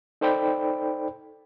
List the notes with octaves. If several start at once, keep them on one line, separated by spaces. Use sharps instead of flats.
D#4 A4 C5 D5 G5 B5